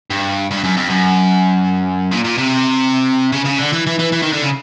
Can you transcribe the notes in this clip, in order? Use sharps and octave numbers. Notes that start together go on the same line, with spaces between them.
G2
G2
F#2
F2
F#2
A#2
A#2
C3
C#3
C#3
D3
E3
E3
E3
E3
D#3
D3
C#3